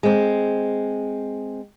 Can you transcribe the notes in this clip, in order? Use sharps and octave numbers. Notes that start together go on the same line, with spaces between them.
G#3 C4